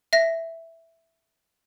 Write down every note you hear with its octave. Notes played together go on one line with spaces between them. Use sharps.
E5 A#6